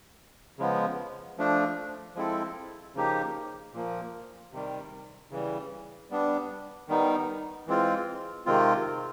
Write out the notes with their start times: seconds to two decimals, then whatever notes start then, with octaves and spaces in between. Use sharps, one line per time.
0.58 C#3 F3 G#3 B3
1.38 F3 A3 D4
2.15 F3 G#3 C4 E4 A4
2.95 C#3 F3 A#3 D#4 G4
3.73 A#2 F3 A#3
4.52 C3 D#3 G3
5.31 C#3 E3 G3
6.10 G3 B3 D4
6.88 D#3 G3 B3 D#4
7.67 E3 G#3 C4 F4
8.46 C3 D#3 G#3 C4 F4